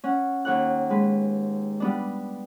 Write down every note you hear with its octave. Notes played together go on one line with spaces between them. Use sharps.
C#4 F#5
D#2 C#5 F#5 F#6
G#3 B4
G3 B3 D4